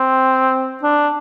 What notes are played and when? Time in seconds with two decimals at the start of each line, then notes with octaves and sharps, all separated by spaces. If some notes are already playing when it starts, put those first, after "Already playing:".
Already playing: C4
0.83 D4